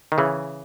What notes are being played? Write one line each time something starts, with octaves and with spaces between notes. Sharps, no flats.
D#3
C#3 E3